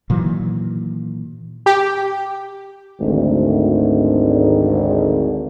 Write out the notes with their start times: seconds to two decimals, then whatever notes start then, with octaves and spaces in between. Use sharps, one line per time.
0.10 A#2 D#3 E3 F#3
1.66 G4
3.01 G#1 D2